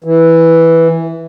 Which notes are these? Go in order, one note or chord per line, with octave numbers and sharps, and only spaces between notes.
E3